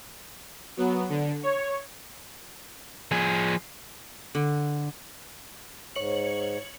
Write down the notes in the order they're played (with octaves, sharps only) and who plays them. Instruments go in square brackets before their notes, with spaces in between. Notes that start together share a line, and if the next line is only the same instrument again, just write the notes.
[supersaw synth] F#3 B3
D3
C#5
[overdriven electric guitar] F3 G#4
[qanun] D3
[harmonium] G#2 [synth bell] C#5 C#7 F#7